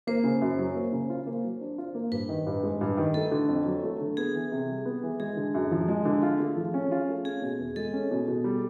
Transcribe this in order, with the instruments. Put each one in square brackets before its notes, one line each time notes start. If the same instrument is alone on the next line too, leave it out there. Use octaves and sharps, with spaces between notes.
[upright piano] A#3 [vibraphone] C5
[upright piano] C#3
F#2
F#3
A#3
C#3
F4
A#3
F#3
D4
F4
A#3
[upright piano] G2 [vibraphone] B4
[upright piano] D#3
G2
G#3
G2
D#3
[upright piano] A3 [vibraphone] A4
[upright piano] D3
F2
F#3
A3
D3
[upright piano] B3 [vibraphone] G#4
[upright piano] E3
C3
G3
B3
E3
[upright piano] G#3 [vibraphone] G#4
[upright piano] D3
F#2
F3
G#3
D3
F4
A3
F3
C#4
F4
A3
[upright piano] C#4 [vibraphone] G#4
[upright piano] B2
E2
[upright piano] G#3 [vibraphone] A4
[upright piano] C#4
B2
B2
G3